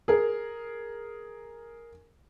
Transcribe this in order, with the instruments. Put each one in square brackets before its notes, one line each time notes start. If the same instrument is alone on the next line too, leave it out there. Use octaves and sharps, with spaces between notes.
[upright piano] G#4 A#4